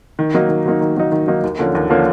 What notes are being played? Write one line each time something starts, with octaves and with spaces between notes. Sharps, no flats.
D#3
F#3 A#3 D#4
D#3
F#3 A#3 D#4
D#3
F#3 A#3 D#4
D#3
F#3 A#3 D#4
D#2
D3 F3 A#3 C#4
D#2
D3 F3 A#3 C#4